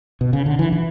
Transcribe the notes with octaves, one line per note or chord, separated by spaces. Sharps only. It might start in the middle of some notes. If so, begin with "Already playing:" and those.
B2
C#3
D3
E3
E3